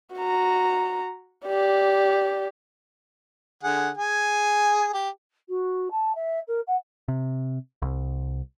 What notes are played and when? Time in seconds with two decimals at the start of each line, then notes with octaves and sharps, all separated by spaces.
0.15 F#4 A#5
1.47 G4 D5
3.63 D3 G#4 F#5
3.97 G#4 G#5
4.94 G4
5.49 F#4
5.91 A5
6.15 E5
6.47 A#4
6.67 F#5
7.08 C3
7.82 C2